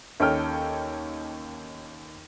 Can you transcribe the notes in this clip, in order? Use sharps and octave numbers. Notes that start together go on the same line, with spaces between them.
D#2 C#4 A4 G5 F6